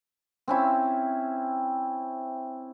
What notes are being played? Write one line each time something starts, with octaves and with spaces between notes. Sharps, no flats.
C4 C#4 E4